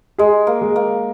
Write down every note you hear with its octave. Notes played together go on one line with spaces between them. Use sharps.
G#3 G#4
A#3
G#3
A#3